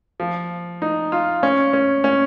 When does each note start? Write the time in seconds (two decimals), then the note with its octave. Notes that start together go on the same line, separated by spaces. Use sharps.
0.20 F3
0.82 D#4
1.12 F4
1.43 C#4
1.73 C#4
2.04 C#4